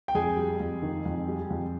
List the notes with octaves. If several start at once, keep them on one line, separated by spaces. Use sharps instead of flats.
G5
F2 G#4 G#5
G3
F2
D#3
F2
G3
F2